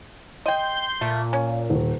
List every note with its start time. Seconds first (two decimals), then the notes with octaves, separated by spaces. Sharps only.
0.46 D#5 G5 C6 G6
1.01 A#2 A3
1.33 C#4
1.70 D#1